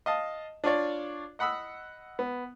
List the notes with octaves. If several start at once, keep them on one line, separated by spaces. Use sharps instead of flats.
D#5 F5 A5
D4 F4 C#5 D5
D#5 F#5 B5 D#6 E6
B3